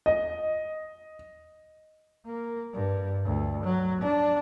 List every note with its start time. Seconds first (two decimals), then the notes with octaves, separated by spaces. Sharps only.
0.06 D#5
2.26 A#3
2.73 G2
3.25 D2
3.64 F#3
4.01 D4